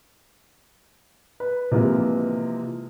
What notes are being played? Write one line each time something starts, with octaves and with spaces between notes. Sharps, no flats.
B4
C3 E3 F3 G#3 A#3 B3